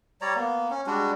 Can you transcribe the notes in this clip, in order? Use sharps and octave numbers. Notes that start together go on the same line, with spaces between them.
G3 C#5 D5 A#5
A#3 B3
C#4
G3 G#3 D4 F#4